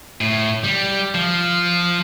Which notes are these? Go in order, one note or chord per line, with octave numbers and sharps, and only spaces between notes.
A2
G3
F3